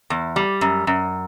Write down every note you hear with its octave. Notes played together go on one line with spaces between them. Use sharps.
E2
G3
F#2
F#2